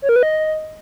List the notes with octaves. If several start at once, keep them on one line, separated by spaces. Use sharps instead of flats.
C#5
A#4
B4
D#5